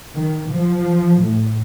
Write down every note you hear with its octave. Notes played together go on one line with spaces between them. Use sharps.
D#3
F3
A2